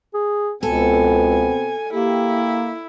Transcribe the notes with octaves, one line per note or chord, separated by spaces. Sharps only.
G#4
C#2 B2 B3 C4 A4 G#5
A#3 E4 G4